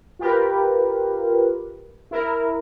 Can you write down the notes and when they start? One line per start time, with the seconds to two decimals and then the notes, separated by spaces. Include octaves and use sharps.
0.19 F4 G4 A#4 B4
2.11 E4 A#4